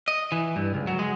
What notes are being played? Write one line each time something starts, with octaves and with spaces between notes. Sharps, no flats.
D#5
E3
G2
C#2
F#3
G#3